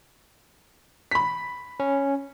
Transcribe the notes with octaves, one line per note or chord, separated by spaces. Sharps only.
B5 B6
C#4